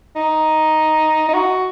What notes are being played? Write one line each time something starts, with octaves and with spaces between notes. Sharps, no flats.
D#4
D#4
F#4